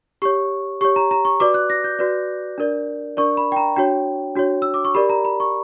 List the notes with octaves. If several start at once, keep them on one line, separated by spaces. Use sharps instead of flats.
G4 C#5 C#6
G4 C#5 C#6
A#5
A#5
C#6
F#4 B4 D5 D6
F#6
A#6
G6
F#4 B4 D5
D4 A#4 D5
D4 A#4 D5 C#6
B5
G5
A#5
D4 F#4 C#5 G5
D4 F#4 C#5
E6
D6
C#6
G4 A#4 D5 B5
A#5
B5
C#6